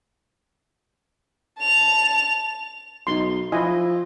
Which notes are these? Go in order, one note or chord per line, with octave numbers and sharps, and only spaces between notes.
A5 F7
B1 D#4 C6
F3 E4 D#5 G#5